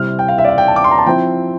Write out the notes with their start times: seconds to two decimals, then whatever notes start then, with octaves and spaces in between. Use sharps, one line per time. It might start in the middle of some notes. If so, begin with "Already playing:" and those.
Already playing: C3 G3 C4 E4 F6
0.19 G5
0.28 F5
0.38 E5
0.44 D5
0.49 E5
0.58 G5
0.68 A5
0.76 D6
0.84 C6
0.91 A#5
0.98 A5
1.06 F3 C4 E4 G5